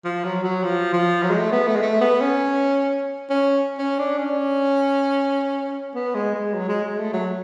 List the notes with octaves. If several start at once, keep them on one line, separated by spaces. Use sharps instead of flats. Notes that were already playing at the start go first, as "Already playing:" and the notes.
F3
F#3
F#3
F3
F3
F#3
G#3
A3
B3
A3
G#3
A3
B3
C#4
C#4
C#4
D4
C#4
B3
G#3
G#3
F#3
G#3
G#3
A3
F#3